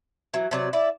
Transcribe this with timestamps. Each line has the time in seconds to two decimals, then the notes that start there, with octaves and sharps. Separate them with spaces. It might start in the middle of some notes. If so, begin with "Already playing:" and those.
0.34 E3 F#3
0.51 C3 F#3 D5
0.73 E4 D5